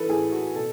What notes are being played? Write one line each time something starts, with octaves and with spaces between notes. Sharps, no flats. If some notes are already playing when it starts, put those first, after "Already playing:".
Already playing: E3 A4 B4
A2 G#4
F#4
B2 A4